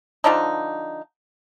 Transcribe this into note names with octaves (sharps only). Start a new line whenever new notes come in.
D3 F3 D4 D#4